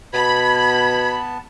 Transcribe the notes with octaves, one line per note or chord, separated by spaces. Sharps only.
B2 B3 A5 B5 G#6